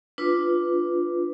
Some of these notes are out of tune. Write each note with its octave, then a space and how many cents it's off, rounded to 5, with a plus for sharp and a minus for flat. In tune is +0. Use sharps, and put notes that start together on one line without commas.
D4 +0 F4 +0 B4 +0